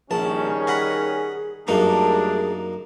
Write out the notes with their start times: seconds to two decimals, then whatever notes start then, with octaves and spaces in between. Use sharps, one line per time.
0.11 A#1 D#3 G3 C#4 G#4 A5
0.67 D#5 F#5 B5
1.68 F#2 G3 A3 A#3 D4 D#4 G#4